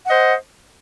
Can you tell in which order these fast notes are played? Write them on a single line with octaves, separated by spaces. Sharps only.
F#5 D#5 C5